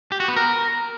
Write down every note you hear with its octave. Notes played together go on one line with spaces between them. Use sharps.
G4
F#4
B3
A#4